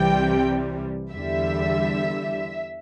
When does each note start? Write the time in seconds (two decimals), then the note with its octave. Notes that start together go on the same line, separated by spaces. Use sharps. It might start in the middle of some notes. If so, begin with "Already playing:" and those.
Already playing: C2 C3 E3 G3 G5
1.11 E2 D3 G3 E5